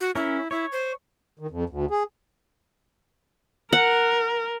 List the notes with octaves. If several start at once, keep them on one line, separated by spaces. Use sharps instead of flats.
F#4
C#4 E4 A#4
E4 C#5
C5
D#3
F2
D2
G#4
A#4 F#5